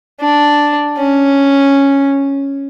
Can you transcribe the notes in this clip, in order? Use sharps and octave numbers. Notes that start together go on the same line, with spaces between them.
D4
C#4